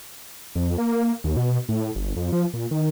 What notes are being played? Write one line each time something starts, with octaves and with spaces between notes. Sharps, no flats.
F2
A#3
D#2
B2
A2
G1
F2
F3
A#2
D#3